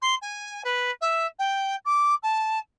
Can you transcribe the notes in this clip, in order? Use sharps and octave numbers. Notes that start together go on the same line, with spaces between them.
C6
G#5
B4
E5
G5
D6
A5